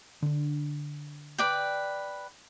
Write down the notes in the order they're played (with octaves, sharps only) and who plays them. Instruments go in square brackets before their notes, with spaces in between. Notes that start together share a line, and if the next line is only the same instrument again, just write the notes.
[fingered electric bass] D3 D4
[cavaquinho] B4 D5 G5